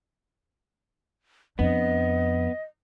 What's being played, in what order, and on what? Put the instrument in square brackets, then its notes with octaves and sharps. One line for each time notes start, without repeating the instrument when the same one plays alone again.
[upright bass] F2 D4 [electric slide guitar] B3 [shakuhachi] D#5